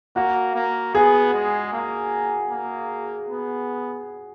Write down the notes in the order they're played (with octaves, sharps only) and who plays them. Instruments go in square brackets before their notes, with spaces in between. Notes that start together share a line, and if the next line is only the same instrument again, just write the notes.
[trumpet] A#3 [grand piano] F#4
[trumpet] A#3
[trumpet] B3 [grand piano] G#4
[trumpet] G#3
A#3
A#3
B3